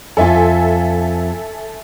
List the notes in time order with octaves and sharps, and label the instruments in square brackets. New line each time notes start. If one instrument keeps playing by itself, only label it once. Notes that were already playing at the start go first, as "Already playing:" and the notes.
[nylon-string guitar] F2 F4 [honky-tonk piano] A4 E5 G#5